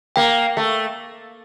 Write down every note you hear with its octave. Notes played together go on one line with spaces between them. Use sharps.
A#3 G5
A3